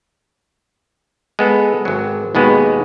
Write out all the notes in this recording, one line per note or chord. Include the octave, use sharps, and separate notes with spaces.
G#3 B3 A4
G#1 F#3
D#2 B2 G#3 B3